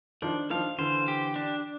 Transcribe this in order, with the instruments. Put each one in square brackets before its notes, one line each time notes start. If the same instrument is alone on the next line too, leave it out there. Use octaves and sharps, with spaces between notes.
[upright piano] D#3 F3 [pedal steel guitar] D4
[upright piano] D#3 F3 [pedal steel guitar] F5
[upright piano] D3 E3 [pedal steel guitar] C5
[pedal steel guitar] G4
D4